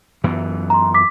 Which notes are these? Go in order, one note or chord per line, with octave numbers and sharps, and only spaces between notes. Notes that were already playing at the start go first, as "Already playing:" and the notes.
F#2 E3 B3
A#5 C6
D6 B6